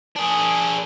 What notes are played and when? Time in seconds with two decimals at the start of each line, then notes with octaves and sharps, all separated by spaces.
0.16 D4 G#4